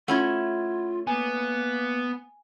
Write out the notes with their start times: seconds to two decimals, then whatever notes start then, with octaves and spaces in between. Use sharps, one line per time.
0.08 A3 C#4 E4 F4 F#5 B5 G#6
1.07 A#3 B3 G#5